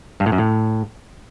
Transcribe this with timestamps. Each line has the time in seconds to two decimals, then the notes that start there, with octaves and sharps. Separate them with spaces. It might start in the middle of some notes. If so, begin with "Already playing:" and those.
0.20 G2
0.26 A2
0.32 F#2
0.38 A2